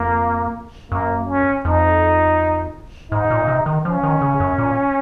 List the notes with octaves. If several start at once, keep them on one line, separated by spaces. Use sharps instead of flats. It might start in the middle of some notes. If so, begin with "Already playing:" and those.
Already playing: F2 A#3
F#2 A#3
C#4
F2 D#4
G#2 D#4
A#2
C3
D#3
F3 C#4
D#3
C#3
F#2
A#2